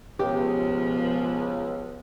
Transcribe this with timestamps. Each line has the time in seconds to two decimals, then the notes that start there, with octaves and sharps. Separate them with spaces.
0.19 C#2 B2 F3 G4